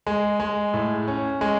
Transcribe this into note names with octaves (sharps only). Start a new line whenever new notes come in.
G#3
G#3
A2
C#4
G#3